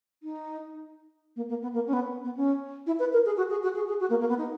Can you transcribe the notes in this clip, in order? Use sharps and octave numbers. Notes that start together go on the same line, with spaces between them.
D#4
A#3
A#3
B3
A#3
C#4
B3
B3
C#4
E4
B4
A#4
G#4
F#4
G#4
F#4
G#4
G#4
F#4
A#3
A#3
B3
D#4